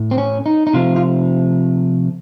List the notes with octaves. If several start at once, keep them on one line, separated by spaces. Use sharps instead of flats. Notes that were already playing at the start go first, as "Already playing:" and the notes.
Already playing: A2
C4
C#4
D#4
D#4
C3 F3 A3 F4
F4